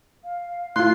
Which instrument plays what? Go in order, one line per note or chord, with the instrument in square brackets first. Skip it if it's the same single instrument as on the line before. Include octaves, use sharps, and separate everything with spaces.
[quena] F5
[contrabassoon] A2 [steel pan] F4 C6 [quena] F5 [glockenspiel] F#6